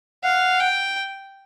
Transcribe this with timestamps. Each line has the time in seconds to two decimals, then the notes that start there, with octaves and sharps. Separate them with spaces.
0.24 F5 F#5
0.60 G5